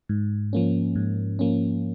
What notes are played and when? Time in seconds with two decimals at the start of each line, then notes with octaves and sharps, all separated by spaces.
0.09 G#2
0.53 F3 A#3 C#4
0.96 G#2
1.39 F3 A#3 C#4